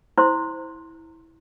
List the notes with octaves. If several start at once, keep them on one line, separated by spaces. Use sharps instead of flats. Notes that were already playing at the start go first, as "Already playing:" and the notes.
E4 C5 C6